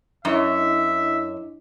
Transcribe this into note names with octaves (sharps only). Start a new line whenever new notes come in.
F#2 D4 E4 C#5 D#5 E5